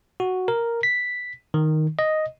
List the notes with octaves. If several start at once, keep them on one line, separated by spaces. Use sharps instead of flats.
F#4
A#4
B6
D#3
D#5